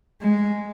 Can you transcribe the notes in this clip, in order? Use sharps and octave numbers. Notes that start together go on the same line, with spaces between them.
G#3